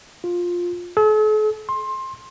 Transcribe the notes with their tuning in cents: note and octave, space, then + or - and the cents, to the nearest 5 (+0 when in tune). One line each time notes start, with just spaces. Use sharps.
F4 +10
A4 -45
C6 +20